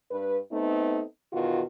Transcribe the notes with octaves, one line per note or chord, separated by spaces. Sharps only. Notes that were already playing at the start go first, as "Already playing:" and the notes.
G2 B4
A3 B3 C4 D#4
E2 B2 D#3 F4 F#4